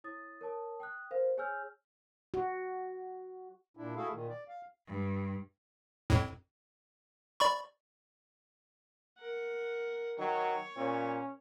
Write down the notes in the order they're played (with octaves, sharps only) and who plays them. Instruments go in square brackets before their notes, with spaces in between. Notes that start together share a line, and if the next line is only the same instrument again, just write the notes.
[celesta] E4 C#5 D#6 A6
A#4 C#5 A5 D#6
G5 D#6 F#6
A#4 C5 F5
G#4 C#5 G#5 E6 F6 G6
[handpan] F#4
[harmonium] A#2 D4 E4
A3 E4 F#4 G#4 A4 F5
A#2 D#3
D5
F5
[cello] G2
[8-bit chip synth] F2 A2
D5 B5 C#6
[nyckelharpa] A#4 F#5
[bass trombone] D#3 [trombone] F#3 [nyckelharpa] C#5
[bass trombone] A#2 [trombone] C#4